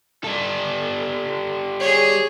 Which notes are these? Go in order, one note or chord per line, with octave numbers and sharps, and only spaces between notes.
G3 A4
G#4 C#5